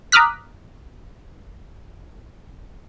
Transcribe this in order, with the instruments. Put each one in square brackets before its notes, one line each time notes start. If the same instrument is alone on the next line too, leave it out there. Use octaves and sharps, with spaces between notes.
[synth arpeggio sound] A#5 D6 D#6 F6 F#6 B6